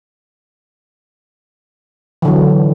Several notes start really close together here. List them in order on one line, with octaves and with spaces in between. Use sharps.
E3 D3 F#3